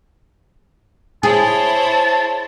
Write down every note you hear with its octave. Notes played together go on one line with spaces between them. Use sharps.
E4 G#4 C5 C#5 A5